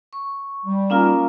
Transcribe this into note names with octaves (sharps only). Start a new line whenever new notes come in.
C#6
G3
A#3 C#4 D#4 F4 A#4 G#5